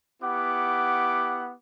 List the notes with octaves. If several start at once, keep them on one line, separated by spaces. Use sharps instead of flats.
B3 E4 G4 F#5 D6